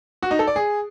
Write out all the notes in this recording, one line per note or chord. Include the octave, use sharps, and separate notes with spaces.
F#4
D#4
A4
D5
G#4